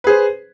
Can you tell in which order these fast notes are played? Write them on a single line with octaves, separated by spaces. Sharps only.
B4 G#4 C5